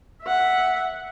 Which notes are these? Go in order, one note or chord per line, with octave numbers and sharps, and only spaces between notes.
E5 F#5